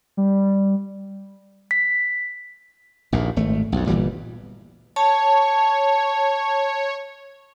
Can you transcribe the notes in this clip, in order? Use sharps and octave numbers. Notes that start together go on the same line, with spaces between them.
G3
B6
A#1 D#2 A#2
G#1 A3
B1 F2
G1 A#2 E3 G3
C#5 A5